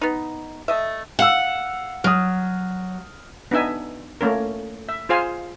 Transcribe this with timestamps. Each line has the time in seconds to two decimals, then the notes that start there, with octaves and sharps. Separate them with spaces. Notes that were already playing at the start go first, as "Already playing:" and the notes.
0.01 B3 D#4
0.68 A3 D#5 E5
1.19 F5 F#5 E6
2.04 F#3 D#6 F6
3.51 B3 D4 D#4 E5 G#5
4.21 A3 A#3 C#4 A#4
4.89 E5
5.09 F4 G#4 C5 F5 G#5